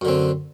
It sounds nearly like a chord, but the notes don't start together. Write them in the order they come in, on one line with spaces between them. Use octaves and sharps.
F#2 D3 C4